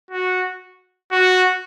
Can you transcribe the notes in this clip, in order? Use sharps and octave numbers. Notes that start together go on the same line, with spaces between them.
F#4
F#4